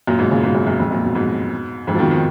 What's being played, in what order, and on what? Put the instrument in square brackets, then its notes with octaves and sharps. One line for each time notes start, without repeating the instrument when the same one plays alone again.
[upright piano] F#2 A#2
G#2 B2
A#2 C#3
G#2 B2
F#2 A#2
F#2 A#2
F2 G#2
F#2 A#2
G#2 B2
G#2 B2
F2 G#2
F3
B2 D#3
B2 D#3